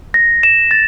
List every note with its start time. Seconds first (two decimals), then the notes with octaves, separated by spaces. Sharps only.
0.14 A#6
0.43 E7
0.71 A6